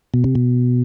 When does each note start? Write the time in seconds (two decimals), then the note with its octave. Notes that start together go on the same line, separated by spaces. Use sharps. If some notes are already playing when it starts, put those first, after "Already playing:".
0.14 B2
0.24 C3
0.35 B2